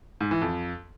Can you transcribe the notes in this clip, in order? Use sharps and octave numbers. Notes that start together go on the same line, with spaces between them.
G#2
E3
F2